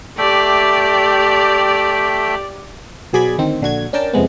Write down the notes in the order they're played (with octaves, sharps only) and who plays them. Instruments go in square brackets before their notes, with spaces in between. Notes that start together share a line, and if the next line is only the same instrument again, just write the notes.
[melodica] A3 E5 G5 [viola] G4 D5
[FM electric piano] B2 F#3 G#4 D5 B5 G#6
D2 D#3 C4
A#1 D3 F#4 G#6
C#4 D4 A#4 G5 A5
F2 C3 G#3 B3